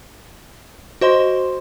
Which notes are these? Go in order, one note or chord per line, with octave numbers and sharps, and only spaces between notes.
F#4 C5 D#5 C6